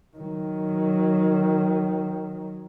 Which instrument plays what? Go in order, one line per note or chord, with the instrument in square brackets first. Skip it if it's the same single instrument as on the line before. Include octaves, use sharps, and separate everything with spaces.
[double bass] D#3 F#3